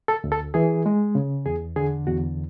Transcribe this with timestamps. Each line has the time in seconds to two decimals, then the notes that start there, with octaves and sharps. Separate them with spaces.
0.08 A4
0.24 D2
0.32 A4
0.54 E3 G#4
0.86 G#3
1.15 C#3
1.46 E2 G#4
1.76 D3 G#4
2.07 E2 F#4